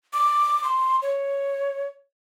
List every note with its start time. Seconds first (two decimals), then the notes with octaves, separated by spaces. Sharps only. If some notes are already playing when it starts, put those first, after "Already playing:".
0.13 D6
0.64 C6
1.02 C#5